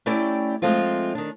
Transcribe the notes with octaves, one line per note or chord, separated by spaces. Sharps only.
A3 C#4 E4 G4 D5 G5
F3 G#3 A3 C4 F4
D#3 D4